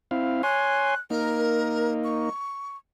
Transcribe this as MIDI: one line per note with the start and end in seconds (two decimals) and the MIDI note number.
0.11 0.42 60
0.11 0.42 64
0.11 0.42 77
0.43 0.95 73
0.43 0.95 80
0.43 0.95 84
0.43 1.00 90
1.10 2.29 58
1.10 2.29 63
1.10 1.94 70
2.04 2.77 85